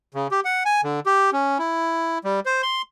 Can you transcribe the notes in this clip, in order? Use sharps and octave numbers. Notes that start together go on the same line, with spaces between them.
C#3
G4
F#5
G#5
D3
G4
C#4
E4
G3
C5
C6